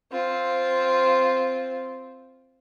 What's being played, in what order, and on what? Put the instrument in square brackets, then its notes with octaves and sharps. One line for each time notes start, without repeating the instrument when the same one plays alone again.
[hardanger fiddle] C4 F4